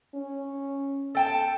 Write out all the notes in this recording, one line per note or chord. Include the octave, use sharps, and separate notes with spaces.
C#4
A4 G5 A5